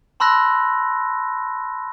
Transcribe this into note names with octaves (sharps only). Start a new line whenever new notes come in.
A5 B5 C6 E6 F#6 A#6